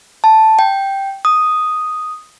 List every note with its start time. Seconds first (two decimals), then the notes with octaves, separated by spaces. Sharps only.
0.24 A5
0.59 G5
1.25 D#6